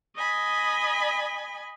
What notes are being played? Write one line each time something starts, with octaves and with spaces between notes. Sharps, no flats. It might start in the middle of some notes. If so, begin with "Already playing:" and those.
D#5 G#5 B5